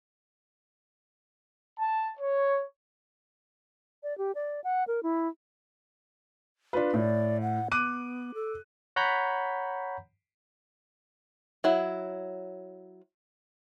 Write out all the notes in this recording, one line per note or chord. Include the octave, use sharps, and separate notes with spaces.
A5
C#5
D5
G4
D5
F#5
A#4
E4
D4 F4 B4
A2 D5
F#5
B3 D6 F#6 D#7
A4
C#5 F#5 A#5 B5 G6 B6
F#3 E4